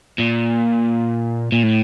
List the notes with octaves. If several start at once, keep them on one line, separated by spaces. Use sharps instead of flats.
A#2
A#2
A2